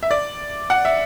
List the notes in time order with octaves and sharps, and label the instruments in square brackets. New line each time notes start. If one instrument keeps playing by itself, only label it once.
[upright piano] E5
D5
F#5
E5